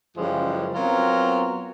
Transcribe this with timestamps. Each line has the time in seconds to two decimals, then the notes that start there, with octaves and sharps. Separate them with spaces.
0.17 F#2 C#3 E3 F3 G3 G#3
0.74 F#3 B3 C4 F4 A#4